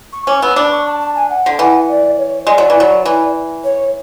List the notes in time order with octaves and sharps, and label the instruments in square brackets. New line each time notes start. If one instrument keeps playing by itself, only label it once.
[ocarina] C#6
[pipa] C#4 [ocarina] D6
[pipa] B3 [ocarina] E6
[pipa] D4 [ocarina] D6
[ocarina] C#6
A5
A5
G#5
F#5
[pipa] D3
[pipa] E3 [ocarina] F#5
[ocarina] D5
C#5
[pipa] G#3 [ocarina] D5
[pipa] F#3
E3
F#3
E3
[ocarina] C#5